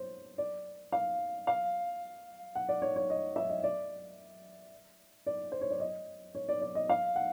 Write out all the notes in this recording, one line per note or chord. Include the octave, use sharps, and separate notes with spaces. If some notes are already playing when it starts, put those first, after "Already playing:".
Already playing: C5 C#5
D5
F5
F5
F#5
D5
C#5
C#5
D#5
E5
D#5
D5
D5
C5
C#5
D5
D#5
C#5
D5
D5
D#5
F5
F#5